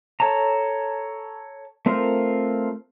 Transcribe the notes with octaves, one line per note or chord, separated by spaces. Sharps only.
A4 C#5 A5 A#5
A3 C4 F4 A#4 C5